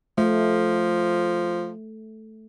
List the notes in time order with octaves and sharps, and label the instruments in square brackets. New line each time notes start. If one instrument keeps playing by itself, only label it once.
[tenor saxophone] F3 [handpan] A3